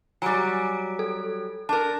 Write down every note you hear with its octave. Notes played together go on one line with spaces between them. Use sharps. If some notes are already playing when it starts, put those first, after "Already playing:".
F#3 G3 G#5 A#5 D7
A4
D4 A#4 A5